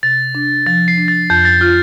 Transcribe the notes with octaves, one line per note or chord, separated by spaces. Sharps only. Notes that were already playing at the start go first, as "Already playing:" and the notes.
C3 A6
D4
F3 A6
C7
D4
A6
F2 G6
A6
F4 F6